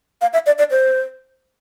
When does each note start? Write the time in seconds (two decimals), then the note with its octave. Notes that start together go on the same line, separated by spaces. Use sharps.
0.21 F5
0.33 E5
0.46 D5
0.59 D5
0.71 C5